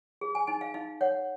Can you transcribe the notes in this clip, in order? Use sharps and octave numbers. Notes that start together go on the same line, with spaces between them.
G#4
G#5
D#4 G#5
F5
D#4 F5
C#5 F#5